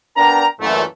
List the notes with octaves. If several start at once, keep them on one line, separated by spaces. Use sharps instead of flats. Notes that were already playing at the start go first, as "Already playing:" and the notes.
B3 D4 A#4 D5 G5 A#5
F#2 A#2 E3 A3